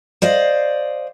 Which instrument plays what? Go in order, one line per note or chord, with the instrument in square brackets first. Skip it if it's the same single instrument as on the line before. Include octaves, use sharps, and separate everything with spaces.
[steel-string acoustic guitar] C5 D5 D#5 F5